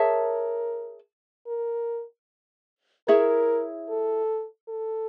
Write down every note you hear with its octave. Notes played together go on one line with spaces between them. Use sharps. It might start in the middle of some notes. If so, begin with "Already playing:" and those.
Already playing: G#4 A#4 C#5 E5 A5
A#4
E4 G#4 A#4 C#5 E5
A4
A4